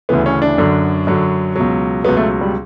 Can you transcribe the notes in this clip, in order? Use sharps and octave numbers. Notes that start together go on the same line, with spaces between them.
D2 C#3 E3 B3
C#4
D4
F#2 D3 F#3
F#2 D3 F#3
C#2 B2 F#3
C#2 B2 F#3 B3
A3
G3